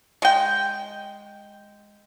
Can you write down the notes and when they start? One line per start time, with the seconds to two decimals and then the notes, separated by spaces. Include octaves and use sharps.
0.22 G#3 G5